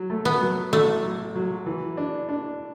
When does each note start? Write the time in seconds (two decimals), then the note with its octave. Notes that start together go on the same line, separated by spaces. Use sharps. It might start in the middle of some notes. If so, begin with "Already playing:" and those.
Already playing: F#3
0.10 A3
0.25 B3
0.41 F#3
0.72 A1 A3
1.03 F#3
1.35 F#3
1.66 E3
1.97 D4
2.29 D4